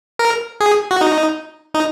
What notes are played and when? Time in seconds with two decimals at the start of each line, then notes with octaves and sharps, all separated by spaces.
0.19 A#4
0.60 G#4
0.91 F#4
1.01 D#4
1.74 D#4